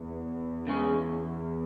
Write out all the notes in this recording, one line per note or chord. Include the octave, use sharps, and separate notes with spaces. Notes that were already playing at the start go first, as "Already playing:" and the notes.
Already playing: E2
C#3 G#3 C#4